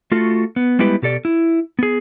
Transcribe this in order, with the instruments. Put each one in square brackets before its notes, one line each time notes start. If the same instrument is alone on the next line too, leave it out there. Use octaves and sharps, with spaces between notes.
[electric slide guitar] A3 F4 F#4 A4
B3
G3 G#3 B3 E4 G4 B4
B2 G4 A4 D5
E4
B3 G#4